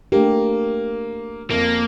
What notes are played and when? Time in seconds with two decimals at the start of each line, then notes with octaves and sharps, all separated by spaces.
0.12 A3 A#3 D4 G4
1.50 F2 A#3